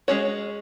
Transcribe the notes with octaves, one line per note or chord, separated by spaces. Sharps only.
G#3 C#4 F#4 C#5